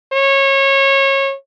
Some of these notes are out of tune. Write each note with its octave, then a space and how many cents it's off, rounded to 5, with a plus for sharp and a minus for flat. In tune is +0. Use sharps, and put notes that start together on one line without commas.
C#5 -25